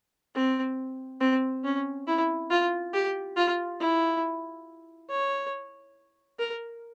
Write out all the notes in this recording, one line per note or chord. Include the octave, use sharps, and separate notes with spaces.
C4
C4
C#4
E4
F4
G4
F4
E4
C#5
A#4